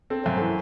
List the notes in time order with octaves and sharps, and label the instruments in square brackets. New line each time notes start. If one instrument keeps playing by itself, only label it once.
[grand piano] C4 [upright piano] A4
[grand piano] F#2 [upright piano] C5
[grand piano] E3 [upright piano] A4